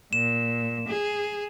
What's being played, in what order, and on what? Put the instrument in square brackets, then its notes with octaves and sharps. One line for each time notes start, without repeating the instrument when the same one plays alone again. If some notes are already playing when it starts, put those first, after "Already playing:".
[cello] A#2 [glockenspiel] E7
[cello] G#4